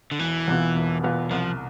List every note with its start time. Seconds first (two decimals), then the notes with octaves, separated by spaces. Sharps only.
0.11 D3
0.19 E1 E3
0.48 E2 B2 B3 F4
0.75 E1
1.03 E2 B2 B3 F4
1.31 C2 F3